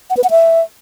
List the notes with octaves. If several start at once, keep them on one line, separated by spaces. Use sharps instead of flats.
F#5
B4
F#5
E5